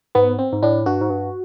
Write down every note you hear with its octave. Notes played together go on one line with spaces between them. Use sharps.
G#2 B3
C4
G#2
A2 D4
G2 F#4
G#2
G2